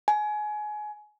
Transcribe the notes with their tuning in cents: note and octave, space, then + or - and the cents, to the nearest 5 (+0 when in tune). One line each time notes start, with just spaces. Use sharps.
G#5 +25